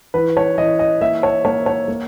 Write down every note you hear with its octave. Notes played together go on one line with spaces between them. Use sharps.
E3 B4
C#5
E3 D#5
D#5
A#3 E5
C#5
A#3 C#5
C#5
A#3